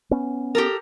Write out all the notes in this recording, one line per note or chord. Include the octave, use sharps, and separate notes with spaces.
B3 C#4
G4 A4 A#4